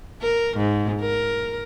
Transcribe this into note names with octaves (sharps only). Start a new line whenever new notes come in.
A#4
G#2
A#4